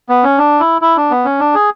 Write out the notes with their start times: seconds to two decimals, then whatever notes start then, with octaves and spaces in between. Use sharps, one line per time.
0.09 B3
0.24 C#4
0.38 D4
0.60 E4
0.82 E4
0.97 D4
1.11 B3
1.25 C#4
1.40 D4
1.55 G#4